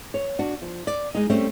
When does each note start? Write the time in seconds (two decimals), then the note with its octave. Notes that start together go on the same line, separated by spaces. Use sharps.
0.14 C#5
0.39 D4 F#4
0.62 F3
0.87 D5
1.15 G#3 D#4
1.30 G3 A3 C4 C#4